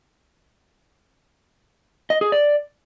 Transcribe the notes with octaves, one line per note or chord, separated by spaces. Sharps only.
D#5
G#4
D5